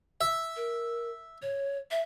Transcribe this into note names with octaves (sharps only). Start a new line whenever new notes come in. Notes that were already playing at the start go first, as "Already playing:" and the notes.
E5
A#4
C#5
E5